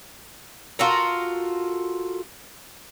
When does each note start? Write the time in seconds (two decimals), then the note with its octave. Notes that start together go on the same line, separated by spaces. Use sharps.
0.79 F4 F#4 A4 A#4